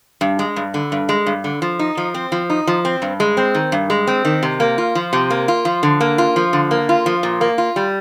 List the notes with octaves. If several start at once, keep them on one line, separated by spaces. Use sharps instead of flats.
G2
G#3
G2
D3
G2
G#3
G2
D3
F3
D#4
F3
C4
F3
D#4
F3
C4
G2
G#3
C4
D#3
G2
G#3
C4
D#3
C3
A#3
F4
F3
C3
A#3
F4
F3
D3
A#3
F4
F3
D3
A#3
F4
F3
A#2
A#3
F4
G3